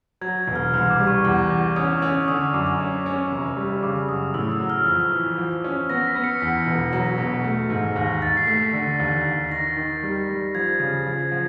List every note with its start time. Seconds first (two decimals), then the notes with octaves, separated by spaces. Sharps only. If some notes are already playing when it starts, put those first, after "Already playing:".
0.21 F#3 G#6
0.47 E1
0.56 F6
0.73 C2 F6
0.90 D6
1.00 G3
1.08 C#6
1.25 E2 D6
1.50 E2
1.76 C#4 D#6
2.02 C#4 E6
2.28 D3 D#6
2.53 F#2 D6
2.67 D6
2.80 C#4
3.06 C#4
3.31 F1
3.57 G3
3.83 C#3 D6
4.09 F#2 D#6
4.34 A2 E6
4.52 E6
4.60 F#3
4.70 F6
4.86 F2
5.11 E3
5.38 F3
5.64 C#4
5.90 B3 A#6
6.07 B6
6.15 B3
6.24 C#7
6.41 E2 B6
6.66 E1
6.93 F#3
7.18 B2
7.44 A3
7.70 G#2
7.96 D#2 A#6
8.22 D#2 A6
8.37 C7
8.47 A3 B6
8.73 D3
9.00 D#2
9.26 D#2
9.50 D#3 A#6
9.76 D#3
10.03 G3
10.29 G3
10.55 F3 G#6
10.79 C#3
11.07 F3
11.32 F3